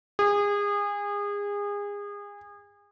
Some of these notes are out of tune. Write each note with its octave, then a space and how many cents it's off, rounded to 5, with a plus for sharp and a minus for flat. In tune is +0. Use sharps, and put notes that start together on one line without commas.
G#4 -30